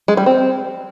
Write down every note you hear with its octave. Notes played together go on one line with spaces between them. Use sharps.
G#3
G3
C4